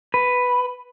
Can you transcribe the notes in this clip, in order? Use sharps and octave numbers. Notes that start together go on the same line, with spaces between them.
B4